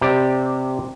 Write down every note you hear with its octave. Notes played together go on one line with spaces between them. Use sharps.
C3 G4 D5